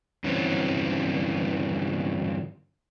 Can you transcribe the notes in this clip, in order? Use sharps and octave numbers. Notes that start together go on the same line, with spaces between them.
G2 D3 E3 F#3 C4 C#4